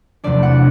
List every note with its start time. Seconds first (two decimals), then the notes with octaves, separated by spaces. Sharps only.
0.24 E2 C3 F3 A3 D4 D5
0.43 F#5